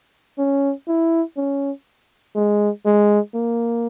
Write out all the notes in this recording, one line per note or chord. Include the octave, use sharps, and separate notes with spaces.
C#4
E4
C#4
G#3
G#3
A#3